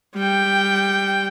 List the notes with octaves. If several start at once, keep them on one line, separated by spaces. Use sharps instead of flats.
G3 G5